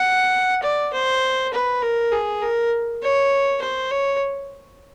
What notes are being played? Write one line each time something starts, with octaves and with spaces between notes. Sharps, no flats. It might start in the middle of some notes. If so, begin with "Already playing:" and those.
Already playing: F#5
D5
C5
B4
A#4
G#4
A#4
C#5
C5
C#5